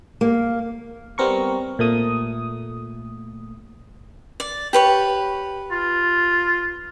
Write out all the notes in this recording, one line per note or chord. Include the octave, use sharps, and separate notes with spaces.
A#3
G3 B3 C4 A#4 C#6
A#2 A3 D#6
D5
G4 B4 C#5
F4